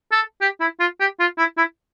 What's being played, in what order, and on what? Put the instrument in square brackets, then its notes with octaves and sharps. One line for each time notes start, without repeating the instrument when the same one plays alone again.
[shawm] A4
G4
E4
F4
G4
F4
E4
E4